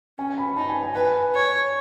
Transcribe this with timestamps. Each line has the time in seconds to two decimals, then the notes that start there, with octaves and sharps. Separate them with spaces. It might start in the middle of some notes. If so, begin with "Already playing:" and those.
0.18 C#4 G#5
0.38 B5
0.56 D#4 A5
0.69 G#5
0.82 G#5
0.95 B4 G#5
1.34 C#5